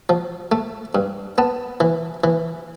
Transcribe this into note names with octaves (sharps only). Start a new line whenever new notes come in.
F3
A3
G2
B3 A5
E3
E3